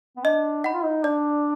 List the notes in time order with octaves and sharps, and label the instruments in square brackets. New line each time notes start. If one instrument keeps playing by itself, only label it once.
[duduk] B3
[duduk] D4 [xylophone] D#5
[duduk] D#4 [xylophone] F#5 B5
[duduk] F4
D#4
[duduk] D4 [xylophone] D5